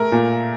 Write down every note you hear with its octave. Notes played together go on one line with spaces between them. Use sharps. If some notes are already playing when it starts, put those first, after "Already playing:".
Already playing: A3 G#4 A#4
A#2